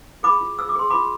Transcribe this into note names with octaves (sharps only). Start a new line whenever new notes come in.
G#4 B5 D6
F4
G#4 E6
D6
G#4 C6
F4 B5 D6